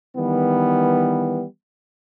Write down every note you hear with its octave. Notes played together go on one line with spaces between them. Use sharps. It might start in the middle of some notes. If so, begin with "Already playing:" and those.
D#3 E3 G3 B3